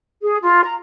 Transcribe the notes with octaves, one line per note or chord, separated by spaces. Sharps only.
G#4
F4
A#5